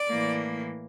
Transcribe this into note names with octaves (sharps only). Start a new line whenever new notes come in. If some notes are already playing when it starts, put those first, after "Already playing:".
Already playing: D5
A2 E3 A#3